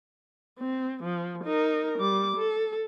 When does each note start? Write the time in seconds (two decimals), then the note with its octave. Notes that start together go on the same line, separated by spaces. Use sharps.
0.59 C4
1.04 F3
1.44 D#4 A#4
1.99 G3 D6
2.37 A4